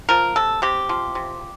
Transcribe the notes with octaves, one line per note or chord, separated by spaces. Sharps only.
F3 A#4
C3 A4
C3 G4
F3
C3